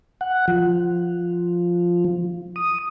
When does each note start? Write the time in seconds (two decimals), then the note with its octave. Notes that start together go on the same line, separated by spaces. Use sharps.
0.21 F#5
0.48 F3
2.56 D#6